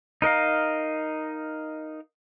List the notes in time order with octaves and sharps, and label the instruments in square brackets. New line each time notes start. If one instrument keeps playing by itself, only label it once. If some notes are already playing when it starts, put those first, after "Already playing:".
[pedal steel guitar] D#4 A#4 D#5 F5